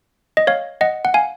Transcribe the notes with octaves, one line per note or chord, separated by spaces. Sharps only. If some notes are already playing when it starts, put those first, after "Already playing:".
D#5
C#5 F5
D#5 F#5
F#5
F5 G#5